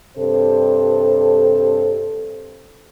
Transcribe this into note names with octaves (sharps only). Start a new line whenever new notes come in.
G2 C3 A4 C5